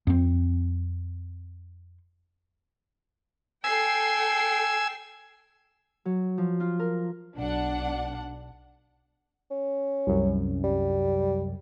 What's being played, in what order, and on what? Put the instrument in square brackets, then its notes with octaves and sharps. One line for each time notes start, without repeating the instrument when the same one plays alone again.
[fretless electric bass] F2 C4
[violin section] A4 G5 C7 [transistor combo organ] G#5 E6
[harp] F#3
F3
F4
A#4
[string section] B1 D4 F#5
[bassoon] C#4
[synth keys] C2 F#2
[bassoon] G3